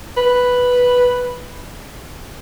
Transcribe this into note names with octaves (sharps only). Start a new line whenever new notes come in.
B4